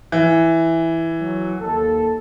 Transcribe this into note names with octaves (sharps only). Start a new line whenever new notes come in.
E3
F#3
D#2 A4